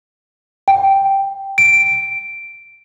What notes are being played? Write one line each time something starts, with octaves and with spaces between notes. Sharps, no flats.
G5
D7